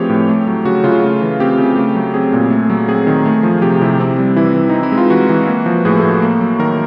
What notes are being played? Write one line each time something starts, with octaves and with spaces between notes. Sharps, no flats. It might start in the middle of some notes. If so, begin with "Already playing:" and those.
Already playing: E3 F3 A3 C4 G4 G#4 C#5
A2
A3
F#3
C#3 F#4
C#3 F4
A3
E3
C4 G4
C#3
A3
F#3
C4 G#4
A#2
A3
F#3
C4 G#4
D#3
A3
F3
C3 G4
C3 E4
C4
G3
E3 E4
E3
C4 D#4
E4
G#3
F4
E3 F#4
E3
A#3
F3
A2 G#4
A4
A2
A4
A#3
F#3
D#3 A#4